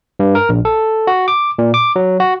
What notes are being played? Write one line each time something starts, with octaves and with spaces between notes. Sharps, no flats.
G2
A#4
A#1
A4
F#4
D6
A#2
D6
F#3
F#4